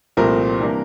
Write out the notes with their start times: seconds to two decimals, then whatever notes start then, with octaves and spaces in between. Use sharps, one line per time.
0.17 C2 A#2 F3 A3 C4 A#4
0.60 C3 E3 G3 A#3 D4